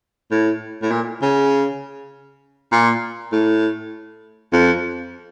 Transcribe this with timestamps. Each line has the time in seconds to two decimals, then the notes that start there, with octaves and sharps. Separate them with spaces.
0.31 A2
0.82 A2
0.91 A#2
1.22 C#3
2.72 A#2
3.32 A2
4.53 F2